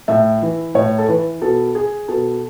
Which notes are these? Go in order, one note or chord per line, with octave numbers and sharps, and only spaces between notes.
A2 E5
E3
A2 C#5
A4
E3 B4
B2 A4
G#4
B2 A4